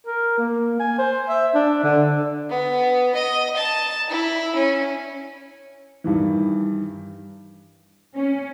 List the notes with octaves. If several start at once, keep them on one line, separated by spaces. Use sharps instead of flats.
A#4
A#3
G#5
C5
E5
D4
D3
B3
D#5
A5
E4
C#4
G2 D#3 E3
C#4